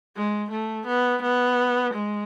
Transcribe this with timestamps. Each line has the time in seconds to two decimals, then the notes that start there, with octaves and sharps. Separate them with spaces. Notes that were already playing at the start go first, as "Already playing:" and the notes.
0.16 G#3
0.52 A3
0.87 B3
1.23 B3
1.94 G#3